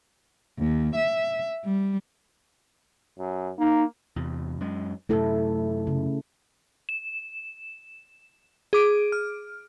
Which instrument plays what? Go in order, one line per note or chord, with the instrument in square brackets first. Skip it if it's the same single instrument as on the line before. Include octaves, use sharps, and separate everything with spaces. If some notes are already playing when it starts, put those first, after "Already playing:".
[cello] D#2
E5
G3
[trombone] F#2
[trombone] A#3 [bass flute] D#4
[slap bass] E2 C3
F#2 G#3
[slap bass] F#2 C3 [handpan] A3 E4 A4
[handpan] C#3
[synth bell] E7
G#4 D6 D7
F6